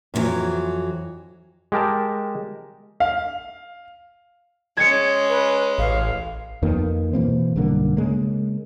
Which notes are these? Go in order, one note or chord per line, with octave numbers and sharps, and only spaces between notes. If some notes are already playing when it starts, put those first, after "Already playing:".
F2 B2 D#3 E3 F#3
G#3 G4 A#4 A5
F5
G#3 C#4 G#6 C#7
B4
A1 F5
F2 D#3 A#3 B3
B2 E3 A#3 C4
B1 G2 D3 A#3
C#3 G#3 A#3